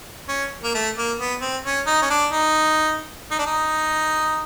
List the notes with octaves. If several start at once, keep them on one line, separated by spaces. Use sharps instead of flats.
C#4
A#3
A3
A#3
B3
C4
C#4
D#4
C#4
D4
D#4
D#4
D4
D#4